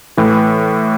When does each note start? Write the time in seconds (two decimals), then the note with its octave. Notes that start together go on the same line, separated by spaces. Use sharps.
0.17 A2 E3